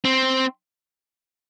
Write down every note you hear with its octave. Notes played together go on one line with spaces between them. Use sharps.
C4